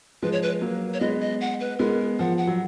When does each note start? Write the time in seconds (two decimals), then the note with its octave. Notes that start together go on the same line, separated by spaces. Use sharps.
0.23 F3 G#3 B4
0.32 C#5
0.43 B4
0.61 F#3 A#3
0.94 C#5
1.00 G#3 B3 D#5
1.21 D#5
1.41 F#5
1.60 B4
1.79 G#3 B3 A#4
2.19 F3 F#5
2.38 F#5
2.47 F#3